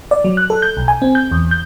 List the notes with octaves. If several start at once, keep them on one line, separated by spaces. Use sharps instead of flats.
D5
F#3
F#6
A4
G6
B1
G#5
C4
G6
E2
G6